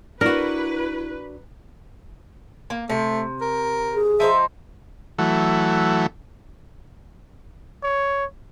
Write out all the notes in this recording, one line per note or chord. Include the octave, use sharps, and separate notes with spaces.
D4 E4 F#4 A#4 B4
A#3
C3 A3
A#4
G#4
F3 D#4 C5 E5
E3 F#3 A3
C#5